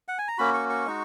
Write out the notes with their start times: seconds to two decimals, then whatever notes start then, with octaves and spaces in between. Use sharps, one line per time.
0.08 F#5
0.18 G#5
0.28 A#5
0.38 A#3 C#4 F#4 B5
0.54 C#6
0.70 C#6
0.86 G#3 D#4 F#4